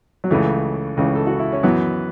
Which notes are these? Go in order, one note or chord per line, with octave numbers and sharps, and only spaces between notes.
F#3
C#2 C#3 E3 A3
C#2 C#3 E3
A4
F#4
E4
C#4
F#2 E3 F#3 B3